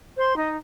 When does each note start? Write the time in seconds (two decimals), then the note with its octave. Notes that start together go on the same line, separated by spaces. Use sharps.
0.17 C5 C6
0.37 D#4 D#5